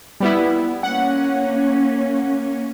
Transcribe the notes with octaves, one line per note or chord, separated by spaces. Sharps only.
G3 B3 E4
A#3 C#4 F#5